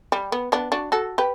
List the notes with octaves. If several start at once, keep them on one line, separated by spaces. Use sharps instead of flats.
G3
B3
B3 D4
D4 F#4
F#4 A4
G4 B4